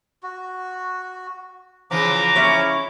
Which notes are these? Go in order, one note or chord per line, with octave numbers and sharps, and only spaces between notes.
F#4
C#3 E3 F3 A#5 D6
C#4 E4 C#5